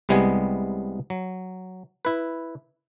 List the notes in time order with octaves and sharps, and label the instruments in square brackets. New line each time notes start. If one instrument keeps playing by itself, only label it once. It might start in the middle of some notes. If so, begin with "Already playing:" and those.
[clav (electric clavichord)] C2 C3 G3 G#3 B3 G#5
F#3
E4 B4